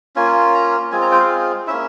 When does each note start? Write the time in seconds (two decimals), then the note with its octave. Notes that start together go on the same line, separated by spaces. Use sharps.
0.16 A#3 C#4 F4 G#5
0.54 A#5
0.92 G#3 C4 F4 G#5
1.01 A#5
1.11 G5
1.20 F5
1.67 A#3 C#4 E4 E5